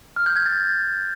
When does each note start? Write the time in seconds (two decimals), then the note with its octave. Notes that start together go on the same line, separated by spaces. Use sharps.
0.16 F6
0.26 G6
0.36 G#6
0.46 A6